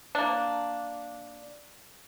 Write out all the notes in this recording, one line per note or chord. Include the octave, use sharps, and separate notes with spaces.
A#3 D4